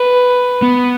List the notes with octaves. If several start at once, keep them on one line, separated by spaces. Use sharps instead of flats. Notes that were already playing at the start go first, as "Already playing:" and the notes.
Already playing: B4
B3